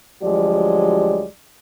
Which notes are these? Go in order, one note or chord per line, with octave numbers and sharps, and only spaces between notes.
D2 F3 F#3 G#3 G4 D5